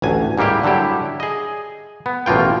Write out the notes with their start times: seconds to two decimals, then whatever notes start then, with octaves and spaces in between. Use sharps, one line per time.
0.02 A1 D2 G#5
0.38 G#2 G3 A#3 E4 G4
0.63 D3 F#3 G3 E4 G4
1.20 G#4 D#5
2.06 B3
2.26 A1 B2 A#3 F4 G5